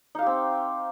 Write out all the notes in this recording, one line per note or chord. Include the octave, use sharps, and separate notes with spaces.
C4 D#4 G4 F5